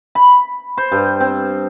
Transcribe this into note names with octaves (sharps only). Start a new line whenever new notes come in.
B5
C5
G2
C4